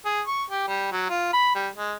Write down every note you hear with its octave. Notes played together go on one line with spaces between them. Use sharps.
G#4
C#6
G4
G3
F#3
F4
B5
G3
G#3